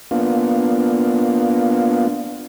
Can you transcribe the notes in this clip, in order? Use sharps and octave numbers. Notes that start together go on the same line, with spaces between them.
A#3 B3 D4 F4